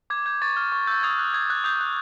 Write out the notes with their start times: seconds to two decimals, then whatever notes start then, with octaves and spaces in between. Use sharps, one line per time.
0.10 D6 G#6
0.26 G6 G#6
0.42 C#6 A6
0.57 F6
0.72 C#6
0.87 E6 G6
1.03 D#6 G#6
1.19 F#6
1.34 D#6 G#6
1.50 F#6
1.64 D#6 G6
1.81 F#6